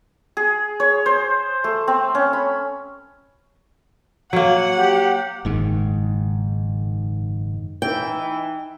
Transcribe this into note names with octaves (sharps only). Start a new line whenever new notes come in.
G#4
C#5
C5
A3
C4
C#4
B5
F#3 A#3 F#5
G4
F#1 G#2 D#3
E3 D#4 G5